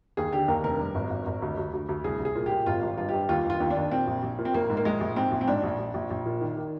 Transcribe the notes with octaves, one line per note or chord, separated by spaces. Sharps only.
D#2 G#4
D3 G4
D#2 A#4
F1 A#4
G2
G#1
G#1
G#1
D2
D2
D2
D2
C2 G#4
C2
G#4
A#2
G4
A#2
G#1 F4
G#1
G2 F4
G4
G2
D#2 F4
D#2 F4
D#2
D4
D#2
A#2 C4
A#1
A#1
A#2
C4
A#1 A#3
G#2
A#3
A#1 G#3
A#1
G#2 C4
A#1
C4
G#2 D4
A#1
A#1
A#1
A#1
A#2
D#3
D#3